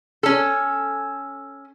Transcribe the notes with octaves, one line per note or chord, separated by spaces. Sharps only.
C#4 A4